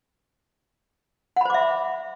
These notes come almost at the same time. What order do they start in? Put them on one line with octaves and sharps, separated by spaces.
F#5 B5 C5 D6 E5